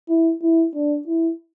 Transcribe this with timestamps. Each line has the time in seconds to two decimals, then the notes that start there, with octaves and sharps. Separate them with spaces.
0.09 E4
0.42 E4
0.74 D4
1.07 E4